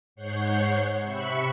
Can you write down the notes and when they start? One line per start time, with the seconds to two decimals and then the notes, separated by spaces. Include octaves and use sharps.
0.16 G#2 C#5 F#5 G6 C7
1.03 C3 E5 B5 C#6 F#6 C#7